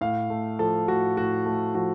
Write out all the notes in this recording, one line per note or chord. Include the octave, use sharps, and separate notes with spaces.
A2 F5
A3
F3 A4
A2 F#4
A2 F#4
A3
F3 F#4